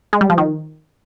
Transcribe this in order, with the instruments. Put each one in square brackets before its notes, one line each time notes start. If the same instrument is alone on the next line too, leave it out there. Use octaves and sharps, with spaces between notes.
[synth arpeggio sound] G#3
G3
F3
D#3